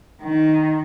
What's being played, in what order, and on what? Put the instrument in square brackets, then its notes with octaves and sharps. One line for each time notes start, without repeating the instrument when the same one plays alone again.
[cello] D#3